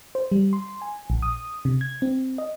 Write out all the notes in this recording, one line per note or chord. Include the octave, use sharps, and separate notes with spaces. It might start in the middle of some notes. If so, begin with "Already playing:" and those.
C5
G3
C6
G#5
A#1
D#6
C3
G#6
C4
D#5